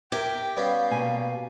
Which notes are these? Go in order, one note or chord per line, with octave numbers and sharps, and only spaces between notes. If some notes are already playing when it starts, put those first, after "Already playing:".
G4 A#4 E5 G5 G#5
G3 B3 C#4 F5
B2 A#3 G#5